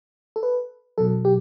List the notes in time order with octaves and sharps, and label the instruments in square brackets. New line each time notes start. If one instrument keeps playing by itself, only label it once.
[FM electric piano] A4
B4
B2 F#3 A4
G4